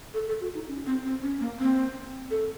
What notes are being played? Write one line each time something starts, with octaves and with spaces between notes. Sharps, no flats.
A4
A4
F#4
D#4
C#4
C4
C4
C#4
A#3
C4
A4